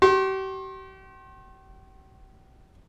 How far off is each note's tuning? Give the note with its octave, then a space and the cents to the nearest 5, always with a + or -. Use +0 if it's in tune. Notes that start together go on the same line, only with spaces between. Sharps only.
G4 -40 C6 +40